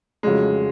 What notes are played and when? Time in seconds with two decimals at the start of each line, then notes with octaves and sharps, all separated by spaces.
0.23 F1 F2 C#3 F#3 G#3